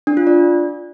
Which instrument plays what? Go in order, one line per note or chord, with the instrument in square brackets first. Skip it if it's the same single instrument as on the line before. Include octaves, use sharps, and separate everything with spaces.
[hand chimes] D4
F4
D5